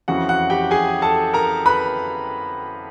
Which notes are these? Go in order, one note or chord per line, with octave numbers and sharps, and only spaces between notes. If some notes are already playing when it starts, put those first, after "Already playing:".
F2 C#3 E3 F#4 F#5
F#4 F#5
G4 G5
G#4 G#5
A4 A5
A#4 A#5
B4 B5